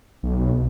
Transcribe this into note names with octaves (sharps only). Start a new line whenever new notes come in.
B1